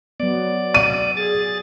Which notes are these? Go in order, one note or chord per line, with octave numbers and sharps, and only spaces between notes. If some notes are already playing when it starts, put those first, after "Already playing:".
F#3 B3 D5
D#7
G#4 A6